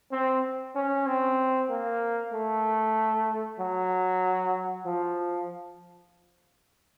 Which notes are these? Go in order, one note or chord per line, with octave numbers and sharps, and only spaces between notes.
C4
C#4
C4
A#3
A3
F#3
F3